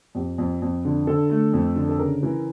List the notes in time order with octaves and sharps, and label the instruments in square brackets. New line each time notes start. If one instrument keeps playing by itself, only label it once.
[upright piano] F2 G4
F2
F2
D3
D3 A4
A3
F2
D3
A4
C#3 A#4
E3